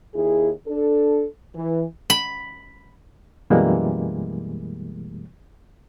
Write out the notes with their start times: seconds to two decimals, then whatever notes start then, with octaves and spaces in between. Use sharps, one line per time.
0.15 D#2 E4 G#4
0.67 D4 A4
1.55 E3
2.10 B5
3.50 F#2 B2 E3 G3 G#3 A#3